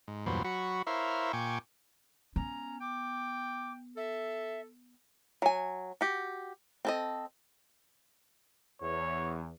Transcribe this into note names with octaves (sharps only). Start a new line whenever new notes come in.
G#2
E2 G2 A#2 F#3 B4 C5
F#3 F#4 B5 C#6
E4 A#4 C5 C#5 E5 F5
A#2 G5 G#5 C#6 D6
B3 C#4 A#5
G5 D6
A4 E5
F#3 G#5
F#4 G4
C4 A4 D#5
E2 C#5